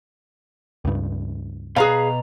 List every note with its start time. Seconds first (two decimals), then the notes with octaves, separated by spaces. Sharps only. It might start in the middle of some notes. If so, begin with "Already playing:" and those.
0.85 C#2 G2
1.76 B2 G#4 B4 F5 A#5